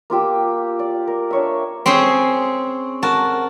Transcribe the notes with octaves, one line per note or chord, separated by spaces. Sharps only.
A#3 F4 G4 E6
D5
A#4
D4 C#5 E5
C4 C#4 G#4 C5
F#4 A#4 A5